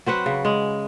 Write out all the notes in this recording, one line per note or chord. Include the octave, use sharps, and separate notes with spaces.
F#3 C4 B4 F#5
C#3
G#3